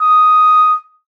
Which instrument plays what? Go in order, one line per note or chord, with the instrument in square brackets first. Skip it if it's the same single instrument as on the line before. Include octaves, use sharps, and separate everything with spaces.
[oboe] D#6